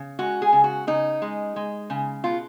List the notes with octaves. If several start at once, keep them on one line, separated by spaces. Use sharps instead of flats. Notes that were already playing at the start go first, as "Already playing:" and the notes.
Already playing: C#3
G#3 F#4
G#4
C#3
F#4
C#3 D#4
G#3
G#3
C#3
B2 F4